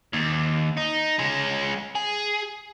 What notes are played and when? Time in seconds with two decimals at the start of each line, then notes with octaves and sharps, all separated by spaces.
0.13 D#2
0.77 D#4
1.19 G#3 C#4
1.95 G#4